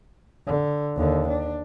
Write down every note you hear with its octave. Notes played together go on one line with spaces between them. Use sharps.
D3
D#2 D3
D4